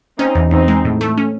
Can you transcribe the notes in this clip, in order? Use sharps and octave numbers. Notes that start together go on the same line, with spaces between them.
C4 C#4 D#4
E2
E2 C4 D#4
G#3
A2
A3
C#4